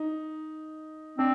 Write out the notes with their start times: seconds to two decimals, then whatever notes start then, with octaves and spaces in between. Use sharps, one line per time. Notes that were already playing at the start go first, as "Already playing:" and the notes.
Already playing: D#4
1.18 C4 D4